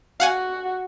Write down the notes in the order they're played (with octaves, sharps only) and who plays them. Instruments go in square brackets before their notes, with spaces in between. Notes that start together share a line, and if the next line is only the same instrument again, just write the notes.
[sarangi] F#4 [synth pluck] F5 F#5 G#5